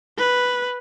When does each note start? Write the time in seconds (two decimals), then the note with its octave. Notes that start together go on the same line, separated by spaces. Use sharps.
0.18 B4